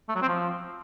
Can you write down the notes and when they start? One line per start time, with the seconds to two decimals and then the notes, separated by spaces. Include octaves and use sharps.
0.09 A3
0.15 F#3
0.22 C4
0.28 F3